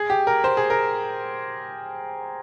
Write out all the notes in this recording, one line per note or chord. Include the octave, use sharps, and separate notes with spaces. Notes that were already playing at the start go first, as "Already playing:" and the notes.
Already playing: G#4
G4
A#4
C5
G#4
A#4